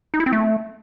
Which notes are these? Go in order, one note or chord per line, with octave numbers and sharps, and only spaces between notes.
D#4
E4
C4
A3